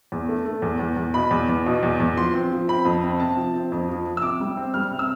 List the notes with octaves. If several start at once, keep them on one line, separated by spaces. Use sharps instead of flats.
E2
A3
A3
E2
E2
E2
B2 B5
E2
E2
B2
E2
E2
F3 C6
C4
F3
C4 B5
F2
C4
C3 A5
F3
C4
F2
F3
F3
E6
C3 D6
G3
C4
G3 F6
C3
E6